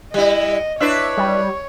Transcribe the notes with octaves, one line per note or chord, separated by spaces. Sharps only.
G3 E4 D#5
D4 E4 B4 C#5 E5
G3